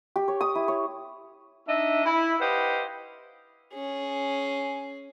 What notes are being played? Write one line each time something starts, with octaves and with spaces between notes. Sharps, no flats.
G4
C#5
D#6
E4
C#5
D4 D#4 D#5 E5
E4
G4 B4 C5 D#5 F5 F#5
C#4 G#4